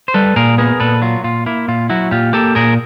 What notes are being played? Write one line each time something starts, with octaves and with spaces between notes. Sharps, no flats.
C5
G3 A4 B4
A#2 G#4 A#4
B3 G#4 A#4
A#2 A4 B4
F#3 F4
A#2 F4
A#3 E4
A#2 F4
F#3 E4 F#4
A#2 F4 G4
A#3 G4 A4
A#2 G#4 A#4